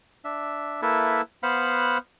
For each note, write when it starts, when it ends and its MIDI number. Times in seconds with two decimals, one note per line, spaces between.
0.25 0.81 62
0.25 0.81 76
0.82 1.21 58
0.82 1.21 64
0.82 1.21 69
0.82 1.21 71
0.82 1.21 76
1.43 1.98 59
1.43 1.98 72
1.43 1.98 77
1.43 1.98 78
1.43 1.98 83
1.43 1.98 90